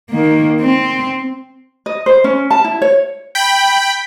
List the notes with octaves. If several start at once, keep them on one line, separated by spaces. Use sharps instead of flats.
D#3 A#3
C4
D#5
C5
C#4
A5
E4
C#5
G5 B5